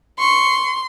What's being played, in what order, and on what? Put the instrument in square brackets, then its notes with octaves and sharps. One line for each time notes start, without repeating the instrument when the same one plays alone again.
[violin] C6 [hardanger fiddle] C#6